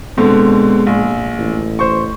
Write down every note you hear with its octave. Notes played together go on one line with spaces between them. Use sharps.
B2 D3 G#3 C4
A#1
A1
C5 C#6